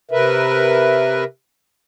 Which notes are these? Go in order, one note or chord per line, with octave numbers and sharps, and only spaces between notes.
C3 A#4 B4 E5